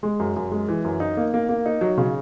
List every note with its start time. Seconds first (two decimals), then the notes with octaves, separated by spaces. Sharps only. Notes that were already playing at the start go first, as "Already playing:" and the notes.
0.03 G#3
0.20 F#2
0.36 F#2
0.51 G#3
0.68 E3
0.85 F#2
1.00 D#4
1.17 A#3
1.34 A#3
1.49 A#3
1.66 D#4
1.81 F#3
1.97 C#3